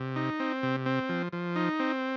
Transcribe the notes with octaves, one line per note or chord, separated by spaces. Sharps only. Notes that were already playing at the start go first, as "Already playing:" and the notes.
Already playing: C3
D#4
C4
C3
C4
F3
F3
D#4
C4